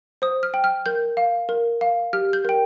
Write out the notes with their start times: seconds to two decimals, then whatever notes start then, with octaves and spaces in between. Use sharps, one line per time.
0.22 C5 D#6
0.43 F6
0.54 G5
0.64 F6
0.86 A#4 G6
1.17 F5
1.49 A#4
1.81 F5
2.13 G4 F6
2.33 G6
2.45 A#4 G5